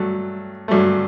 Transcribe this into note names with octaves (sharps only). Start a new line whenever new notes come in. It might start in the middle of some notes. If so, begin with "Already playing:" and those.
Already playing: G2 F#3 A3
G2 F#3 A3